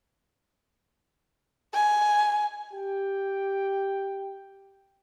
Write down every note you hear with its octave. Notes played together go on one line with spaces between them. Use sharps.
G#5
G4 G5